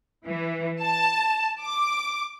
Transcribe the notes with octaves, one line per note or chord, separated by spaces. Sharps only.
E3
A5
D6